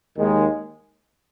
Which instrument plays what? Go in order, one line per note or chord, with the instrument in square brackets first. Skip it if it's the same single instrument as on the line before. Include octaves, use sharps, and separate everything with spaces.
[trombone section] D#2 D#3 G#3